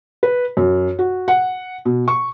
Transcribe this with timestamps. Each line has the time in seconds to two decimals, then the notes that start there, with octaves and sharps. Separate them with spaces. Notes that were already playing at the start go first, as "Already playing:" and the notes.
0.23 B4
0.57 F#2
0.99 F#4
1.28 F#5
1.85 B2
2.08 C#6